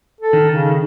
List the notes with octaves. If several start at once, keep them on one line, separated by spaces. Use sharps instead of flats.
A4
D#3
C#3